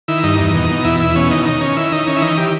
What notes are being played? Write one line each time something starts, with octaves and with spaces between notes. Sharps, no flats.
D#3 E4
G2 D#4
E2
B2
B2
E2 E4
E2 E4
B2 C#4
D#3 D#4
D#3 D#4
D#3 C#4
D#3 E4
D#3 D#4
D#3 C#4
E4
E3 D#4
E3 G4